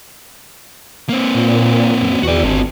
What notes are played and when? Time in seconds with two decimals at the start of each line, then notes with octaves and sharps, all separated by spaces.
1.09 A#3 C4
1.35 A#2
2.02 F#2
2.23 E2 F#4 D5
2.44 G1 C4 F#4